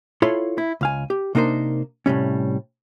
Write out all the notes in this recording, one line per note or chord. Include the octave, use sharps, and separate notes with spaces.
E4 F4 A4 C#5 B5 C6
E4
C#2 F5 G#5
G4
C3 A#3 D4 D#4 A#4 C5
A2 C3 G3 C#4